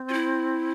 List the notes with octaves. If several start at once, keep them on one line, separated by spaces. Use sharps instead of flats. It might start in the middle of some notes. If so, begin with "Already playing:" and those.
Already playing: C4
F4
E4